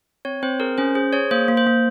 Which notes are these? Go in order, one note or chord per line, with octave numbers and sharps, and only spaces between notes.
C4 C#5
C4 C5
G#4 A#4
C#4 C5
G#4 C5
G#4 C#5
A#3 C5
A#3
C5
A#3